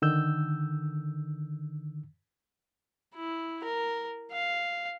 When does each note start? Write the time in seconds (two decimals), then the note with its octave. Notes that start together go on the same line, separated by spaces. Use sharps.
0.02 D3 D#3 E6 G6
3.15 E4
3.64 A#4
4.32 F5